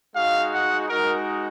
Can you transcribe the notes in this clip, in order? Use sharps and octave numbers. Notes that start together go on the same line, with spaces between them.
G#3 D#4 F#4 F5
F#5
G#3 D#4 F#4 A#4